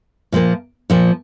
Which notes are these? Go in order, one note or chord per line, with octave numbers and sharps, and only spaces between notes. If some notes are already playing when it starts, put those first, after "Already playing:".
A#2 F3 A#3
A#2 F3 A#3